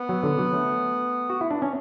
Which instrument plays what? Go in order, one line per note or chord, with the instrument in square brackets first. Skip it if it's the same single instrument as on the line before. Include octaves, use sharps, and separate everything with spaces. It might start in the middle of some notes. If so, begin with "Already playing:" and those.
Already playing: [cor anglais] B3
[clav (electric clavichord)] F#3
D3
F#3
A3
F#4
E4
D4
C#4